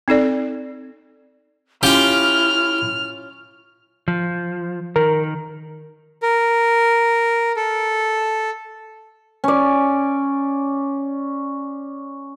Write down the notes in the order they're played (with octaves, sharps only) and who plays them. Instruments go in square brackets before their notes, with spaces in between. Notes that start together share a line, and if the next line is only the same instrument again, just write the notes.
[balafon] C4 D#4 A4 D5
[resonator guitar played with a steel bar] C#4 F4 [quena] E4 [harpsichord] G4 G5 [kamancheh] F6
[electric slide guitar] F3
[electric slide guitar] D#3 [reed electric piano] A#4
[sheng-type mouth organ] A#4
A4
[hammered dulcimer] C#4 D5